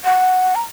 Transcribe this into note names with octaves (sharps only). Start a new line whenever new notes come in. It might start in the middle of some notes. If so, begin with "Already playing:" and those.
F#5
A#5